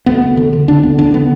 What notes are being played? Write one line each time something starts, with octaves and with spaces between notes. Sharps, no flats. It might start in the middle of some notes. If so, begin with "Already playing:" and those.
D2 B3
D2
D3
D3
D2 D4
D2 B3
D3 D4
D3 B3